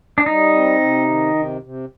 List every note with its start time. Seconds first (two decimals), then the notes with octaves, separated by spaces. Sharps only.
0.18 D4
0.26 G3 D#4
0.54 C4
0.81 C3
1.08 D#3
1.35 C3
1.62 C3